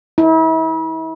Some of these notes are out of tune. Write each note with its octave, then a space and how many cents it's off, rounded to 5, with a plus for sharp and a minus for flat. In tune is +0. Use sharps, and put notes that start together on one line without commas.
E4 -40